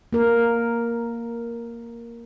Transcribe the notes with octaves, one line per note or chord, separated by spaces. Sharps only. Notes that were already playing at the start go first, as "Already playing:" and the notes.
A#3 A#4